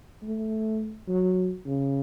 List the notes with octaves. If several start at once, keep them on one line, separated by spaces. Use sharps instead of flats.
A3
F#3
C#3